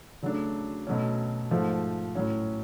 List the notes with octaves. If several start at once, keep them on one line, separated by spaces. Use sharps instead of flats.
C#3 F#3 A3 D4
B2 F#3 A3 C#4
G#2 F3 A3
A2 F#3 C#4